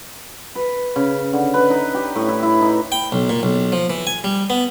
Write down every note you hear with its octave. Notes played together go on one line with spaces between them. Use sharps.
B4
C#3
D3
B4
D#4
G4
A2
E4
E4
D#4
G5
B1
A#2
B1
F3
E3
G#5
G3
B3